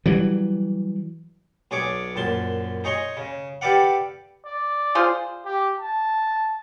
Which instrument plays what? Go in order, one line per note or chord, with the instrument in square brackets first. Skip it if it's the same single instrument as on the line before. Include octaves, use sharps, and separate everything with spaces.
[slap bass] E3 F#3 G3
[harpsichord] B1 D4 G#4 C#5 D6
A#1 F#2 A5 C6
D#4 G#4 C#5 A#5 C6
C#3
G4 A4 B4 D5 F5 F#5
[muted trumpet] D5
[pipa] F4 G#4 C5
[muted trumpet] G4
A5